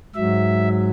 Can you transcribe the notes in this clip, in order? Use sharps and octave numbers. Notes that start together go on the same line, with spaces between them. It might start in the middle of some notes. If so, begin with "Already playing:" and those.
G#2 F#3 E5